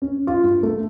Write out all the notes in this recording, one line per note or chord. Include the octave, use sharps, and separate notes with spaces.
C#4
F4
G2
A3